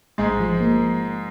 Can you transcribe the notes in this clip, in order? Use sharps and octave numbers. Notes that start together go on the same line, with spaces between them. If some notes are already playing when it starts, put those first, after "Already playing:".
A1 G#2 G#3
F3
A#3